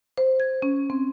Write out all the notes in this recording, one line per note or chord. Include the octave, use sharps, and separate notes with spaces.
C5
G#6
C#4
C4